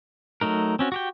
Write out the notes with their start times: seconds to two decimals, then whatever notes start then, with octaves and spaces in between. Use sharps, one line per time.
0.41 F#3 A3 D#4 A#4
0.79 C4 C#4 F#4
0.92 F#4 G4 G5